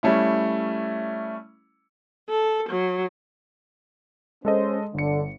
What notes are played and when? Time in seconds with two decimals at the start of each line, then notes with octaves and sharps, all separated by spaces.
0.03 G3 A3 C#4 E4
2.29 A4
2.69 F#3
4.45 G#3 C#4 A4 C5 D#5
4.94 G1 D3 C#7